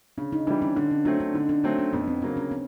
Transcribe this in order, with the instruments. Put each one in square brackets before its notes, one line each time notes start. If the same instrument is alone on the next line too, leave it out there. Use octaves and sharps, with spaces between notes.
[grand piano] C#3 [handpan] D4
[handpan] D#4
[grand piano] E3 G3 [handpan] D4
[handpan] C#4
[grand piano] D3 [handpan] D4
[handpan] C#4
[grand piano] F#3 A3 C4 [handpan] D4
[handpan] D4
[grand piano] D3 [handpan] D#4
[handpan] D4
[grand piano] F#3 A3 C4 [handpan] D4
[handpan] C#4
[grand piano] F2 [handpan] B3
[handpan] C4
[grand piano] C#3 F#3 A#3 [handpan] C4
[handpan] C#4
C4